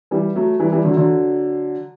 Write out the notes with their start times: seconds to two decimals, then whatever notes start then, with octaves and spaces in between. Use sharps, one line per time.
0.11 E3 G3
0.35 F#3 A3
0.60 E3 G3
0.72 E3 G3
0.85 D3 F#3
0.97 D3 F#3